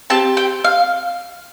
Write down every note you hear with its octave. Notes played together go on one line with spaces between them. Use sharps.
C4 G4 A5
G5
F5